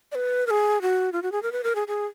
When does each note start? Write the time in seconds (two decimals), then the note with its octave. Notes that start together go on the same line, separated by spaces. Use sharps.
0.12 D5
0.15 B4
0.47 A#4
0.50 G#4
0.82 F#4
1.12 F4
1.23 F#4
1.32 G#4
1.43 A#4
1.52 B4
1.64 A#4
1.75 G#4
1.88 G#4